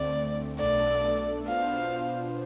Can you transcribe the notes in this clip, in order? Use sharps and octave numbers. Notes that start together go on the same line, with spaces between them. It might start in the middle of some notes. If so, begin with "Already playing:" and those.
Already playing: D2 D3 A3 C4 D5
B1 B2 A3 D4 A4 D5
B2 B3 D4 F4 C5 F5